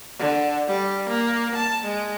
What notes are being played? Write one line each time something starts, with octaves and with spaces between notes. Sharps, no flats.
D3
G3
A#3
A5
G#3